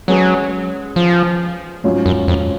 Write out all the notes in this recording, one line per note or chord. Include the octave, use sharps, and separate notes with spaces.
F#3 G#3 C#4 G#4 B4
F3
G#2 F#3 C#4 F4
F#2
F2